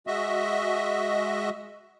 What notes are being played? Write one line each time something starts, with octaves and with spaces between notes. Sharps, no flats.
G#3 F#4 D#5 E5